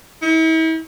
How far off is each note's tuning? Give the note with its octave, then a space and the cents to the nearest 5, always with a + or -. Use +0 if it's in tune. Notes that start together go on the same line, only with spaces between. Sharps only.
E4 -40